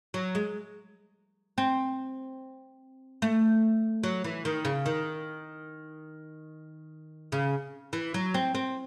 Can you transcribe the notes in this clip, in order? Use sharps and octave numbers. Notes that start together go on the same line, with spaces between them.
F#3
G#3
C4
A3
F#3
E3
D#3
C#3
D#3
C#3
E3
F#3
C4
C4